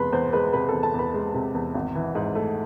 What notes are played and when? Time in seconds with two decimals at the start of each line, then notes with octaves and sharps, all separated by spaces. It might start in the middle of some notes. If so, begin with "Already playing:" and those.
Already playing: E2 C3 G#3 B4 B5 C6
0.12 E2 C5 C6
0.33 G#3 B4 B5
0.53 C3 B4 B5
0.69 E2 A4 A5
0.83 A4 A5
0.94 E2 B4 B5
1.14 G#3
1.35 C3
1.55 E2
1.75 G#1
1.95 E3
2.15 G#2
2.35 A3